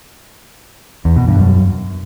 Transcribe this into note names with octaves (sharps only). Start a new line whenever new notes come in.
E2
B2
G2
F#2